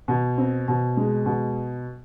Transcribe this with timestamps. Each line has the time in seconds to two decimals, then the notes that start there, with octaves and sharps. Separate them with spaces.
0.08 B2
0.38 C4
0.68 B2
0.97 G#3
1.26 B2